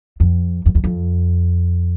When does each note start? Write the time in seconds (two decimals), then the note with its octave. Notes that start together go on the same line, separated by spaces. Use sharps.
0.20 F2
0.66 F2
0.75 E2
0.84 F2